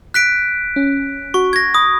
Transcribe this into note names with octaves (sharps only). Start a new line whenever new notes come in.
F#6 B6 D7
C#4
F#4 C#6
G#6 A#6
B5 D#6